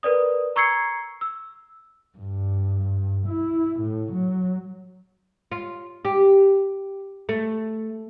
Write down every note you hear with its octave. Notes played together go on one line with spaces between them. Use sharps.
A#4 B4 D5 D#6
A#5 C#6 E6 G#6 C7 C#7
E6
G2
E4
A2
F#3
F4
G4
A3